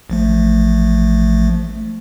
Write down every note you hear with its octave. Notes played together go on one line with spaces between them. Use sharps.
A1 F3 A3